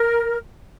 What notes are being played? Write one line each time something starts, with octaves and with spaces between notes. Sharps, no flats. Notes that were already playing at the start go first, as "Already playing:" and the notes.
Already playing: A#4